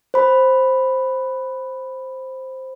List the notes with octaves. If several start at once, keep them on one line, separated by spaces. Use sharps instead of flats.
C5 B5